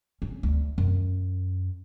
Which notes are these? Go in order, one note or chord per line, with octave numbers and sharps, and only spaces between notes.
C#4
D2
F#2